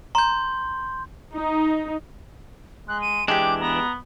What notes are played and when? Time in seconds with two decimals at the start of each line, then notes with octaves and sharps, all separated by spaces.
0.15 A#5 C6 G6
1.35 D#4
2.88 G#3 F#6
3.02 D#7
3.28 E3 G#3 D4 G4 G5 D6
3.61 B3 A#5